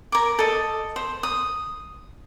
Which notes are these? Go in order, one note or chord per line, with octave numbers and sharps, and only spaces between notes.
A#4 D6
A4 D#5
C5
D#6